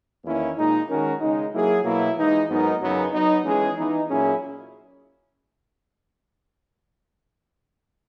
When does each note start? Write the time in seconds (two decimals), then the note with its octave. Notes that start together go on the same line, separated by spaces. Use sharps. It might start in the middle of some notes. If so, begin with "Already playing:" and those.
0.24 E2 D#3 A#3 C#4 E4
0.56 A#2 G#3 D#4
0.89 D#3 G#3 C#4 F#4 A#4
1.21 C#3 G#3 D#4
1.53 F#3 A#3 E4 G#4
1.84 B2 F#3 A#3 E4
2.16 E3 G#3 D#4
2.49 G#2 F#3 B3 D#4 A#4
2.81 F#2 C#3 F#3 B3 D#4
3.12 F#3 B3 D#4
3.45 E3 G#3 C#4 G#4
3.77 E3 B3 D#4
4.09 A#2 F#3 C#4 E4 G#4